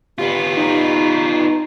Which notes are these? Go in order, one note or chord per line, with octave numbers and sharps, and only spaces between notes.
B3 F4 G4
D#4